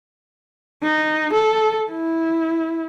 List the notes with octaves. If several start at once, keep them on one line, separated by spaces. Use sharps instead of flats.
D#4
A4
E4